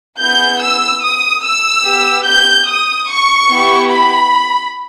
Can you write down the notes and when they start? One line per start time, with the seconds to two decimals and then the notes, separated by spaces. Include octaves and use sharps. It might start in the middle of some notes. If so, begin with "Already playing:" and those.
0.19 B3 E4 G#4 G6
0.61 E6
1.02 D#6
1.43 E6
1.84 B3 G4
2.25 G6
2.67 D#6
3.08 C#6
3.49 B3 E4 G4
3.90 B5